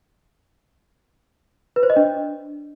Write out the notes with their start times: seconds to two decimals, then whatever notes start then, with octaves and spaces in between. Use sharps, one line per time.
1.76 B4
1.83 C5
1.90 D#5
1.96 D4